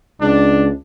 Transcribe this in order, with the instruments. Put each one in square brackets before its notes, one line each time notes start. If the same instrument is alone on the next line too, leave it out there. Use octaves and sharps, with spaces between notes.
[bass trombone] C#2 [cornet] D4